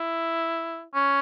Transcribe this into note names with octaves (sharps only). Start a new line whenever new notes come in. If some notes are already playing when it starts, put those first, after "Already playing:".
Already playing: E4
C#4